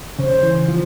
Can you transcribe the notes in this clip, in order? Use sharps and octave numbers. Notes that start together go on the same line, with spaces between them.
C#3 C5
E3
F3